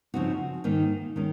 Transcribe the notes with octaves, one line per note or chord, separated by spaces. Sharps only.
C#3 F3 C4 D#4 F#4
G#2 D#3 A#3 D#4
D#3 G#3 C#4